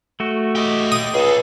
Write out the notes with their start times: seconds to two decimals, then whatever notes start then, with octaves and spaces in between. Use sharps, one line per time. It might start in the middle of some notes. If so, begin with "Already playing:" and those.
0.20 A3 F#4
0.55 G4 D#5
0.92 D#6
1.14 C#2 G#4 A4